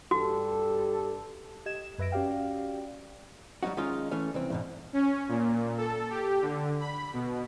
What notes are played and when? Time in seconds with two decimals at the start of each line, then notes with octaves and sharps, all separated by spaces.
0.11 G2 F#4 G4 A4
1.66 G4 D#5 G#6 E7
1.98 F#2 B4 E5 A#6 D7
2.12 C#4 F#4 G4 D5 F5 G5
3.63 F#3 G3 C4 D#4 F#4
3.77 D#3 G#3 C#4 D#4 F4
4.11 E3 A3 C#4
4.34 C2 E3 C4
4.50 E2 G#2 B2
4.93 C#4
5.29 A#2
5.78 A4
6.10 G4
6.42 D3
6.80 B5
7.13 B2